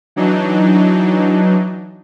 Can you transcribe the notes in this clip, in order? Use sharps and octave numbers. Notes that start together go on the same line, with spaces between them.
E3 F#3 D4 D#4